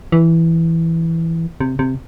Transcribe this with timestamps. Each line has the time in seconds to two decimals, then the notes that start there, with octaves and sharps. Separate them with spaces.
0.12 E3
1.60 C3
1.79 C3